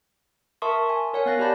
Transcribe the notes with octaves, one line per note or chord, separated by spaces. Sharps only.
A#4 E5 A5 C6 C#6 D#6
G#5
A#4 C#5 F#5 G#5
B3 F5 F#6 A6 A#6
G4 D5 A5 B5 G6